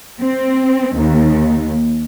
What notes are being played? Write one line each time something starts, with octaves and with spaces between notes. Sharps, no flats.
C4
D#2